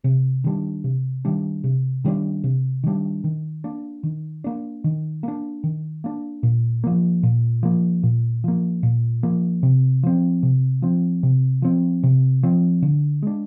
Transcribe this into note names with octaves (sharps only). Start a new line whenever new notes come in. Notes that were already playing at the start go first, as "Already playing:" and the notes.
C3
D#3 G3 D4
C3
D#3 G3 D4
C3
D#3 G3 D4
C3
D#3 G3 D4
D#3
A#3 D4
D#3
A#3 D4
D#3
A#3 D4
D#3
A#3 D4
A#2
F3 A#3
A#2
F3 A#3
A#2
F3 A#3
A#2
F3 A#3
C3
F3 C4
C3
F3 C4
C3
F3 C4
C3
F3 C4
D3
G#3 D4